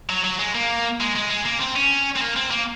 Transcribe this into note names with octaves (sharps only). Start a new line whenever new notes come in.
F#3
F#3
G#3
A#3
G#3
G#3
G#3
A#3
C4
C#4
C4
A#3
C4
A#3